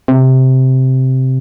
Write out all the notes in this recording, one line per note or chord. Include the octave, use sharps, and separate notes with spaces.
C3